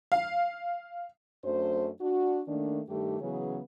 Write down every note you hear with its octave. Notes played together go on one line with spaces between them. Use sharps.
F5
F#2 F#3 A3 D4 C5
D4 F#4
D#3 A3 A#3 D4
G2 D#3 A3 G4
C#3 E3 F#3 B3 C#4 G#4